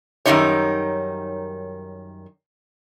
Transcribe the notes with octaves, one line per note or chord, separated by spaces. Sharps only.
F#2 D#3 F3 G3 D#4 C#5